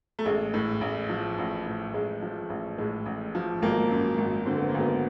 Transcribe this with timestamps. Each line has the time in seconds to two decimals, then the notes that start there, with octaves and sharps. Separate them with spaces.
0.19 A3
0.25 A1 G#3
0.54 A2
0.81 A1
1.10 F3
1.38 A1
1.66 A2
1.94 A1 G#3
2.22 F3
2.50 A1
2.78 A2 G#3
3.06 A1
3.35 F3
3.62 G#1 A#3
3.91 F#2
4.18 G#1
4.46 D3 C4
4.58 B3
4.69 A#3
4.74 G#1
4.80 B3